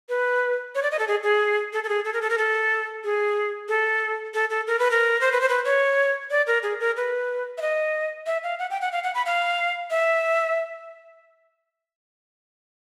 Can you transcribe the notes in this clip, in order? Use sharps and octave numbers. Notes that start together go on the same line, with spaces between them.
B4
C#5
D5
D#5
A4
G#4
G#4
A4
A4
G#4
A4
A#4
A4
A#4
A4
G#4
A4
A4
A4
A#4
B4
A#4
C5
B4
C5
B4
C#5
D5
A#4
G#4
A#4
B4
E5
D#5
E5
F5
F#5
G5
F#5
F5
F#5
B5
F5
E5